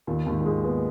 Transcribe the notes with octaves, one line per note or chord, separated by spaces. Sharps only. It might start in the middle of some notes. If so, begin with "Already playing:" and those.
D#2 A#2
D#2 G#2
A#2
G#2 G#3
A#2 B3